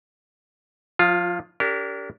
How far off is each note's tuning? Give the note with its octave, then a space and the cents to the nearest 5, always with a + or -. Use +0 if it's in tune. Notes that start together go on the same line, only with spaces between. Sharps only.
F3 +35 F4 +0
D4 -35 G4 +0 A#4 -25